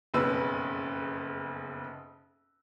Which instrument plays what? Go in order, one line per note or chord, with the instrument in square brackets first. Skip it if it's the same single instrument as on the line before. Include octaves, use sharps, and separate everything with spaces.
[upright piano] F#1 B1 F2 C#3 B4 E6